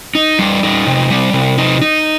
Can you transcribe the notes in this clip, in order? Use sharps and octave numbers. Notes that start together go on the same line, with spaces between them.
D#4
G3
D#4
C3
G3
C3
D#4
D#4